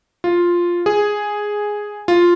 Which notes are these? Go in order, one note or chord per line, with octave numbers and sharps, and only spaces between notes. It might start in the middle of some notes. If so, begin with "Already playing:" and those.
F4
G#4
F4